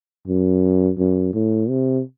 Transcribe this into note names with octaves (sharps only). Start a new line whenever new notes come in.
F#2
F#2
A2
C3